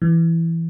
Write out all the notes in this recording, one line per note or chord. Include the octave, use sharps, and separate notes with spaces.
E3